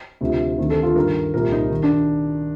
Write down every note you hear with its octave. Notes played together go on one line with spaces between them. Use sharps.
D2 C3 F3
D2 C3 D#3
A4
F4
G2 D#3 A#4
C2 A#2 F3 A#4
D#4
D#3
D4